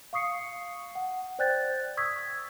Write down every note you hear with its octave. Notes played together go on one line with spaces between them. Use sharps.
F5 C#6 D#6 C7 C#7
F#5
C5 D5 G5 F#6 G6 A6
C#6 D#6 E6 G#6 B6